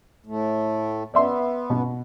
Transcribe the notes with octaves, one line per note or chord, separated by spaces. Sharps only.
A2 A3
B3 D5 E5 C6
B2